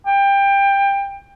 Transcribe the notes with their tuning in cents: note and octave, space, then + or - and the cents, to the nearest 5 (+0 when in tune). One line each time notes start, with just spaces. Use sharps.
G5 +20